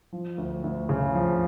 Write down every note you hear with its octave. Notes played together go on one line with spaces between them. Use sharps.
F3
D2
D2
C#3
F3